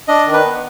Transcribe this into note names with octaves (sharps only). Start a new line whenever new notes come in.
D4 D#5
D#3
B4
B3